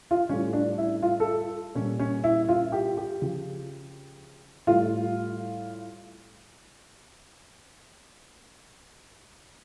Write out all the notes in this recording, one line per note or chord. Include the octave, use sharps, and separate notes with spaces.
F4
A2 G3 C#4
D4
E4
F4
A4
A#2 G3 C#4
C#4
E4
F4
G4
G4
C#3 F3
A2 G3 F4